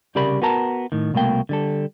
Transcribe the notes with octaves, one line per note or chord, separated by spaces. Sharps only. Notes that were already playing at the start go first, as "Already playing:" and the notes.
C2 C#3 G4 A#4 D5 B5
B3 F#4 A#4 A5 A#5
A2 D#3
C2 B2 A3 A#3 G5
D3 G3 A4